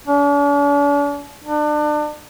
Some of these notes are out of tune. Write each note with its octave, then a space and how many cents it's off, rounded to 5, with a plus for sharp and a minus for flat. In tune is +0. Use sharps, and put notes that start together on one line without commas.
D4 -45
D4 +30